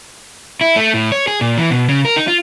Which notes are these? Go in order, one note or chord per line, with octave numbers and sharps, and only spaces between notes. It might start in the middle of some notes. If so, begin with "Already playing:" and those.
E4
A3
A2
C#5
G#4
A#2
E3
B2
C#3
A#4
D#4
F4